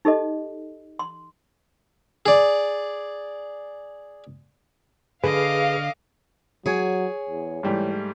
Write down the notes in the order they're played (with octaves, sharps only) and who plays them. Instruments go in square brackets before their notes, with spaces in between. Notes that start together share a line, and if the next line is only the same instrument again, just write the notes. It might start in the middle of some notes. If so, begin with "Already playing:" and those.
[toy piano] D#4 G4 A4 D#5
C6
[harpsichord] G#4 D5
[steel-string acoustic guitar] D3 [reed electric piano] G#4 B4 [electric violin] D#5 D6 [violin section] F5
[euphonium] F#3 [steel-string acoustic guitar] G#4 C#5 G#5
[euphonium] E2
[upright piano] G#2 G3 A3 [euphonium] E3